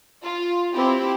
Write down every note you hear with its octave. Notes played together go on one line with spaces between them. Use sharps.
F4
C4 E4 G4